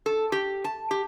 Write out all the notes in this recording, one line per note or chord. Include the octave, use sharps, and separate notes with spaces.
A4
G4
A5
G4